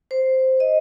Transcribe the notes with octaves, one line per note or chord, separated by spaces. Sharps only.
C5
D#5